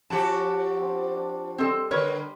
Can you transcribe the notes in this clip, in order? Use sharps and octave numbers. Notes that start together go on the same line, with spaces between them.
F3 C#4 F#4 G4 A5 B5
C4 D4
D4
G3 C4 A4 D#5 C6
D3 A#4 B4 C#5